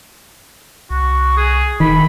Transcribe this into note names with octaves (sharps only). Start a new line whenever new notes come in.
C2 F#4
G#4
E1 D#3 B5